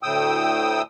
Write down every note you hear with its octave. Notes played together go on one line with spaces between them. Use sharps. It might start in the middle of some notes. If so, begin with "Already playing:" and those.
D2 A2 G5 D#6 E6